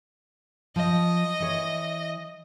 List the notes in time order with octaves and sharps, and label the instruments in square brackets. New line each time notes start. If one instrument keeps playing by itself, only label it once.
[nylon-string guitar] F3 [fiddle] D#5
[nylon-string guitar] E3 C#5